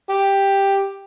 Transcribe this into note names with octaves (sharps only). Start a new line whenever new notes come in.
G4